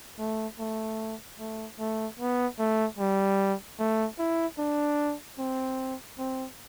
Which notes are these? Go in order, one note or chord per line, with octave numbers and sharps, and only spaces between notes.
A3
A3
A3
A3
B3
A3
G3
A3
E4
D4
C4
C4